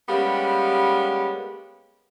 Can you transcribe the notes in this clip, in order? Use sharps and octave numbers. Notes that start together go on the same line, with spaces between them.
G3 G#3 A#3 B3 C#4 G4